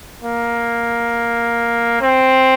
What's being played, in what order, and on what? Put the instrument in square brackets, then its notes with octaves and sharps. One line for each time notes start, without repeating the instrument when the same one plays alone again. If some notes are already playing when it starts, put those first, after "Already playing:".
[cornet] A#3
C4